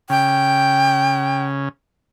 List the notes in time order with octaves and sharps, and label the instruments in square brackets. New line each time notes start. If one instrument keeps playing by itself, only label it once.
[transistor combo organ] C#3 [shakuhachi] G5